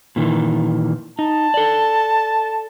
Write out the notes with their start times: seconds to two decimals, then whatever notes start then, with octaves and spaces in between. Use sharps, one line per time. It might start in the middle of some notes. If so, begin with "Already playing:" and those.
0.16 A#2 D#3 E3
1.19 D#4 A5
1.54 A4 D5